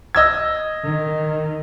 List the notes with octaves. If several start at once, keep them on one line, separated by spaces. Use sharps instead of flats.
D#5 E6 G#6
D#3